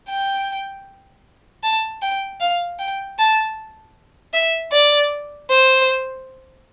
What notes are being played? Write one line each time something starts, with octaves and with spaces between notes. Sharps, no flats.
G5
A5
G5
F5
G5
A5
E5
D5
C5